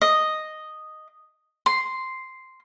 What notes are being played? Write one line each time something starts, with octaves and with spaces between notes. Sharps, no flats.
D#5
C6